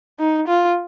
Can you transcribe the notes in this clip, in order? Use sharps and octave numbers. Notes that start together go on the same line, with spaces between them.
D#4
F4